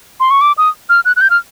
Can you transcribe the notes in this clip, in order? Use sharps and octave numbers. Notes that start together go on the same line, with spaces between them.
C6
C#6
D6
D#6
F6
F#6
F#6
G6
F6